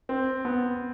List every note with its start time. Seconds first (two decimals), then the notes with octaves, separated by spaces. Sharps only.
0.09 C4
0.45 B3